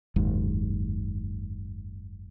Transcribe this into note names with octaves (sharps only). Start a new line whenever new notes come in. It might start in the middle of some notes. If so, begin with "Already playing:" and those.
F#1 D#2 G#2